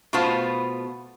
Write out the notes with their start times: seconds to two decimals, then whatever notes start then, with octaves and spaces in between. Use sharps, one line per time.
0.13 B2 A3 B3 F4 C5 A5